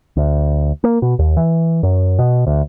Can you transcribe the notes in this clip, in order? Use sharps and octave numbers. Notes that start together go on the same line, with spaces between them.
D2
A#3
B2
D#2
E3
F#2
B2
D2